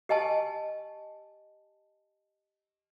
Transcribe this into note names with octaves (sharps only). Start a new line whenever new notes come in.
G4 D#5 G#5 A5